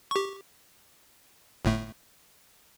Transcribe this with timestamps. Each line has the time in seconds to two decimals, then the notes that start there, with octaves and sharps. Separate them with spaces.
0.11 G4 C#6
1.65 G1 A2 A3